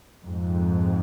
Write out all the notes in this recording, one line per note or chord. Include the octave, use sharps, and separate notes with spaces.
F2 G#2